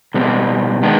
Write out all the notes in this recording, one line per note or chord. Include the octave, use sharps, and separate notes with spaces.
B2 G3 C4
D#3 G#3 B3 D4